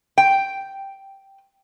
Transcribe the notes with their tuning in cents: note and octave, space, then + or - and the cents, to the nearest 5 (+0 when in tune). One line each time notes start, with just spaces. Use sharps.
G5 -5